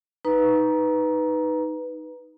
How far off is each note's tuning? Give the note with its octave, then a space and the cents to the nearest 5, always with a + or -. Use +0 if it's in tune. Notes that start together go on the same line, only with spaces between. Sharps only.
D#4 +0 B4 +0 A#5 +15